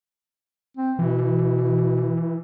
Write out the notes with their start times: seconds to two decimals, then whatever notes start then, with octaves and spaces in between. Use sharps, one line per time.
0.77 C4
0.99 B2 E3